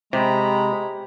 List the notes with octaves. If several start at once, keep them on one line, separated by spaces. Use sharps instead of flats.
C3 G#3 G4 A#5 B5